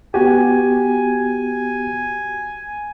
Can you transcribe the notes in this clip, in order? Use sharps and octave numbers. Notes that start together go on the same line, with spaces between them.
B3 F#4 G4 G#5